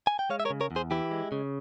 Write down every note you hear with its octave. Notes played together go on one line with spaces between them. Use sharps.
G#5
G5
G#3 C#5 F5
E5
A#4 C#5
C#3
A#4 C#5
E2
G#4 C5
E3 E4 G4
G#3
C#3